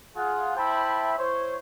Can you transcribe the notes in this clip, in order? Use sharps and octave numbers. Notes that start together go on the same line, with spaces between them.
F4 G#4 F#5
E4 C5 E5 G5 A5 B5
E4 C5 C#5